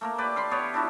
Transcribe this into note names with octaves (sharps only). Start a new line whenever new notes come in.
A3 A#3 A#4
G4 B4 D5
F5 B5 C6
B3 G4 C#5 A5
D4 E4 F#4